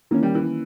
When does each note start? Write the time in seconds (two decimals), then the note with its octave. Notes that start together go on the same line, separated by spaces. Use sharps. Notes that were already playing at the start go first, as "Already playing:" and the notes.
0.11 D#3 E3 A#3 C#4
0.23 G3
0.35 E3